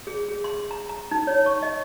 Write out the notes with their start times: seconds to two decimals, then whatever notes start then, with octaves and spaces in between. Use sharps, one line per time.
0.07 G#4
0.28 G#4
0.44 C6
0.71 A#5
0.89 A#5
1.11 D#4
1.27 C#5
1.46 C#6
1.63 D#5